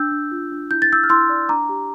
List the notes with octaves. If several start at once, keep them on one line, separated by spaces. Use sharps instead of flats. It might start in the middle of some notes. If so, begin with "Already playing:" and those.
Already playing: D4 E6 G6
D4
F4
D4
E4 G6
A6
E4 E6 G6
F6
E4 C6 E6
D5
D4 A#5 D6
G4